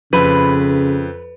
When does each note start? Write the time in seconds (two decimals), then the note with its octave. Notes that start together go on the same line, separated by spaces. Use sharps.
0.13 F2 C#3 B4